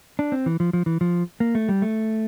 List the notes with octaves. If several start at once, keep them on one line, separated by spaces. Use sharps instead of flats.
D4
C4
E3
F3
F3
E3
F3
A#3
A3
G3
A3